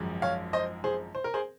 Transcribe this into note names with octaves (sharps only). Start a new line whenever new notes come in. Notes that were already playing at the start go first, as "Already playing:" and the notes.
Already playing: G#1 F#2 F3 G#3
C#5 F5
C5 D#5
G#4 C5
C5
A#4
G#4 C5